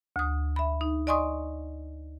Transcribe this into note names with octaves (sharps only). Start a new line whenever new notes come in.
D2 D#6
E5 B5
D#4
D5 D#5 G#5 C6 C#6 D#6